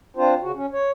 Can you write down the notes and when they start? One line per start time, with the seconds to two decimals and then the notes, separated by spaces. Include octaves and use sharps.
0.17 C4 D4 F4 C5
0.41 C#3 F#4
0.55 C#4
0.73 C#5